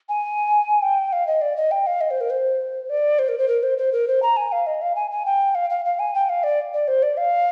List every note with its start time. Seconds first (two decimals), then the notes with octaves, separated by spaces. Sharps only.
0.09 G#5
0.83 G5
1.13 F5
1.27 D#5
1.41 D5
1.56 D#5
1.71 G5
1.87 F5
2.01 D#5
2.11 C5
2.21 A#4
2.30 C5
2.90 D5
3.19 C5
3.29 A#4
3.38 C5
3.48 A#4
3.63 C5
3.78 C5
3.92 A#4
4.08 C5
4.22 A#5
4.37 G#5
4.52 F5
4.67 D#5
4.82 F5
4.96 G#5
5.11 G#5
5.26 G5
5.55 F5
5.70 F5
5.85 F5
5.99 G#5
6.14 G5
6.29 F5
6.44 D5
6.74 D5
6.88 C5
7.03 D5
7.17 F5